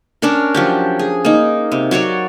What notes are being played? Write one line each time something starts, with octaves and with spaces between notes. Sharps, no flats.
C#4 D4 A#4
F3 F#3 G4
G#4
A#3 D#4
C3
F#3 F#4 C#5 D5